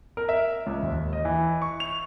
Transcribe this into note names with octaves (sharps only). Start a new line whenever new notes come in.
A#4
E5
C#2
D#2
D#5
E3
C#6
F7